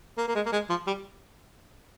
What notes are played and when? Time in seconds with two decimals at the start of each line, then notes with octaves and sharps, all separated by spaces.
0.18 A#3
0.28 A#3
0.35 G#3
0.46 A#3
0.53 G#3
0.70 F3
0.87 G3